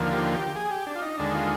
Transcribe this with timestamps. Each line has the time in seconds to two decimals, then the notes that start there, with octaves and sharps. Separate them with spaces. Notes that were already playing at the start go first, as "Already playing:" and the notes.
Already playing: D#2 D3 F3 A#3
0.12 G4
0.34 G4
0.56 G#4
0.71 G4
0.87 D4
0.96 F4
1.02 D#4
1.18 D#2 D3 G#3 D4
1.35 F4